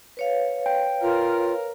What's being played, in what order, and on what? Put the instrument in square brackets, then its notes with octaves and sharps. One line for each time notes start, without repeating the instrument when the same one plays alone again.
[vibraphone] B4 C#5 F5
[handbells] G5
[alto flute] F4 [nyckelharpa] A#4